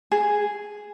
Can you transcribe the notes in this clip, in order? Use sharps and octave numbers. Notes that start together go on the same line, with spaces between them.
G#4